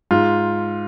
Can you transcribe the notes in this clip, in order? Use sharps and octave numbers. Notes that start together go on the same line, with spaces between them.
G#2 F4